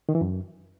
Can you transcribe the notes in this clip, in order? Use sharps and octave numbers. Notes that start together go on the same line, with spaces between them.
D#3
E3
F#2